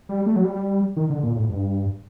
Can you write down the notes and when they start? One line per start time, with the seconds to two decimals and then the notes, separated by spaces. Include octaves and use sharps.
0.09 G3
0.26 A3
0.36 F#3
0.44 G3
0.97 D#3
1.10 D3
1.23 A#2
1.36 A2
1.49 G2